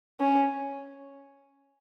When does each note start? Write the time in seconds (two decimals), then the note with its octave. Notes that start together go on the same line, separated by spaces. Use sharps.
0.20 C#4